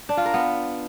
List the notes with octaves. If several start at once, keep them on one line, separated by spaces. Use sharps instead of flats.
D4
F4
A#4
B3